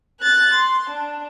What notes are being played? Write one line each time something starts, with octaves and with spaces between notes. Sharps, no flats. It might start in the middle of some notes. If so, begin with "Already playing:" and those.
F#6 A6
C6
D4